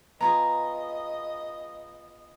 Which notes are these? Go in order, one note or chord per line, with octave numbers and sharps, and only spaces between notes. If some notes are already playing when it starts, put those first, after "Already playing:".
B3 F4 G#4 D#5 A#5